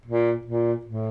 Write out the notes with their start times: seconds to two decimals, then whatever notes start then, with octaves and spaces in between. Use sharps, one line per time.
0.06 A#2
0.45 A#2
0.85 A2